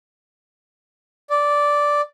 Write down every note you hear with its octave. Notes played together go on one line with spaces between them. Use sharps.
D5